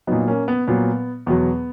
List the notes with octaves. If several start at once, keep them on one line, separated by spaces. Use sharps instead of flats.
A#2 F#3 B3 D#4
A#3 C#4
B3
A#2 F#3 B3
E2 B2 F#3 B3